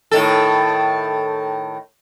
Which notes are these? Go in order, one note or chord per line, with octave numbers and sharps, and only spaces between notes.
A2 D#3 A4